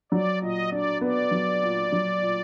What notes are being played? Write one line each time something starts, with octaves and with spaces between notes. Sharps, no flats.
F#3 D5
A#2 D#5
D4 D5
B3 D5
F#3
A#2
F#3
A#2